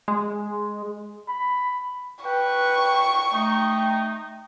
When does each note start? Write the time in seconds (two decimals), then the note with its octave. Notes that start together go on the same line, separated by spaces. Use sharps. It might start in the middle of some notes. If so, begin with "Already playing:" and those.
0.08 G#3
1.28 B5
2.25 B4 G5 C#6
3.33 A3 D#4